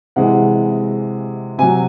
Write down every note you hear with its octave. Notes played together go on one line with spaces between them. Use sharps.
C3 E3 G#3 F#5
C3 F#3 G#5